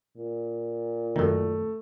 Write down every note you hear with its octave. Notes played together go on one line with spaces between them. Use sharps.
A#2
F#2 D#3 A3